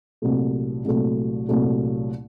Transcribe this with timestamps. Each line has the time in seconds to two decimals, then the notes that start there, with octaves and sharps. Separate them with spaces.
0.22 C2 A#2 F#3 A3
0.85 C2 A#2 F#3 A3
1.49 C2 A#2 F#3 A3